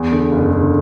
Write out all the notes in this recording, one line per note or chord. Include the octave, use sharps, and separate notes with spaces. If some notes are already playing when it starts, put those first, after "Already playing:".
Already playing: E2
D3
F#1
D3